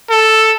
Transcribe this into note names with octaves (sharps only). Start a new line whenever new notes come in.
A4